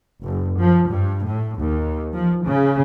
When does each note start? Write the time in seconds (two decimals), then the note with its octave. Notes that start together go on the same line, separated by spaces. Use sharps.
0.24 F#1
0.60 F3
0.90 G2
1.28 A2
1.61 D#2
2.13 F3
2.44 C#3